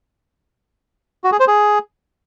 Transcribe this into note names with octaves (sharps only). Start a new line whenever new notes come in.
F#4
G#4
C5
G#4